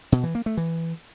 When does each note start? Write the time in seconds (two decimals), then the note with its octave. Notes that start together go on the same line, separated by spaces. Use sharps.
0.12 B2
0.24 E3
0.35 A#3
0.46 A3
0.57 E3